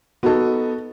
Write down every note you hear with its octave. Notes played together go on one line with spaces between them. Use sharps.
B3 D#4 F#4 A4